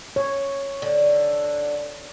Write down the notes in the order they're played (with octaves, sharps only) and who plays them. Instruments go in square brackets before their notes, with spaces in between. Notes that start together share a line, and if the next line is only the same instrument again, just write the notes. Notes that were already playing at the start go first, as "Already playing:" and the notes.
[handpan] C#5
[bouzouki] D3